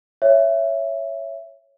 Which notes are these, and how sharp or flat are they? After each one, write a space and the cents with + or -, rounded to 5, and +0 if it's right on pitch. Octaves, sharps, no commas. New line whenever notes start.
C#5 +0 E5 +15